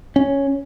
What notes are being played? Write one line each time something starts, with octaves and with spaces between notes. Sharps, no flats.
C#4